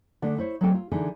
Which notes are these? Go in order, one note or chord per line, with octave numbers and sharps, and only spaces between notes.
D3 G#3 A3 D4
E4 C5 C#5
F#3 G#3 A3 C4 A4 G5
F4
D3 E3 D#4 G#4